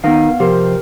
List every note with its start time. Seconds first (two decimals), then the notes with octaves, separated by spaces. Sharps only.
0.04 D#3 B3 D#4 A#4 F5
0.40 C3 F3 G4 A#4 C5